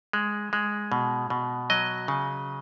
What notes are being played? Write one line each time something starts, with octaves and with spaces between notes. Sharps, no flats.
G#3
G#3
B2
B2
F#3 D#5
C#3